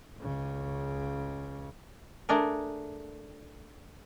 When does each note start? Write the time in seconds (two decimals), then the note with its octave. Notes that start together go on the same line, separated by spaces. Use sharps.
0.19 C#2 C#3
2.29 A3 D4 G#4 A#4